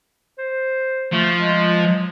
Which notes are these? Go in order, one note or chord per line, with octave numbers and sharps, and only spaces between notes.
C5
F3 A3
G#3